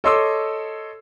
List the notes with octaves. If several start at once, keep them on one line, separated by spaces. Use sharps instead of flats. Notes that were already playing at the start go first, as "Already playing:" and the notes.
A4 C#5 D#5 C6 D6 E6